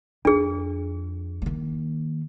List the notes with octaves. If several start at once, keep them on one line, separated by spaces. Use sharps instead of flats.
F2 D4 G#4
D#3 A#3